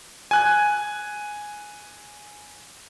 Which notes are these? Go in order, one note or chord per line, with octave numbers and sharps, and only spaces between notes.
G#5 F#6 G#6